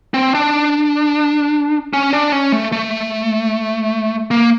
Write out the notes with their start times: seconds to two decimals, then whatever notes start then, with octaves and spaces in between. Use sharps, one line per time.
0.14 C4
0.35 D4
1.93 C#4
2.13 D4
2.32 C#4
2.52 A3
2.72 A3
4.31 A#3